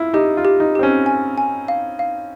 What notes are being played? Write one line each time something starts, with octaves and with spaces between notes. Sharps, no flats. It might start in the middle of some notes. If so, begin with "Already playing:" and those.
Already playing: E4 F4
D#4 G4
F4
G4
D#4
C4 G4
C#4
G#5
G#5
F5
F5